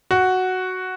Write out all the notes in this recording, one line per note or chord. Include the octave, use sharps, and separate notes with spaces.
F#4